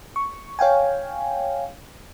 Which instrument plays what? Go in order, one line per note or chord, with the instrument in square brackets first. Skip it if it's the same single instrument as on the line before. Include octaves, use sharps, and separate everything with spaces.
[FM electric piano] C#6
C#5 F5 G5 G#5